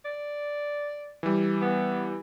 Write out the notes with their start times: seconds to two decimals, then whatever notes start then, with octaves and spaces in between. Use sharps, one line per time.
0.05 D5
1.23 E3 G3
1.62 B3